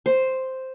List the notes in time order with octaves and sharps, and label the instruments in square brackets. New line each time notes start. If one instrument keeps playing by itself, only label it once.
[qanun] C5